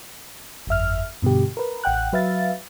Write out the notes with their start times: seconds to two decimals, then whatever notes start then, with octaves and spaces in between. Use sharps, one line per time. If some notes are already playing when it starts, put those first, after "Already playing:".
0.67 G1 F2 E5 F6
1.22 G2 B2 D3 G4
1.57 A#4 B4
1.84 A1 F#5 G5 F#6
2.13 F#3 B4 E5 F5 A6